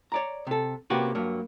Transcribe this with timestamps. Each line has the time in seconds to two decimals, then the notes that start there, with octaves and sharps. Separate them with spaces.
0.12 C#5 D5 A#5
0.47 C3 A4
0.90 C3 A#3 C#4 F#4 G4 B4
1.15 G2 F#3 A#3